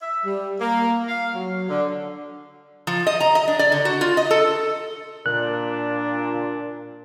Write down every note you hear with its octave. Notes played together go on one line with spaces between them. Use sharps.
E5
G3
A#3
F5
F#3
D3
F3
D#5
A#5
D#5
D4
D5
D3
F#4
F4
D#5
A4
A#2 D4 F#6